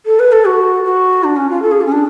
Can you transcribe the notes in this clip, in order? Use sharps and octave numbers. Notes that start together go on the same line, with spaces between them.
A4
B4
A4
F#4
F#4
D4
C#4
F4
A4
G#4
F4
C#4
D4